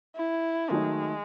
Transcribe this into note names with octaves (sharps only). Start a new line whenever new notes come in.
E4
D#3 F#3 G#3 A3 D#4